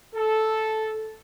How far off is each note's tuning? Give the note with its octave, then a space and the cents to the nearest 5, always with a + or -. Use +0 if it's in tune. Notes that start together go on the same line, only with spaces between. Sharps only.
A4 -5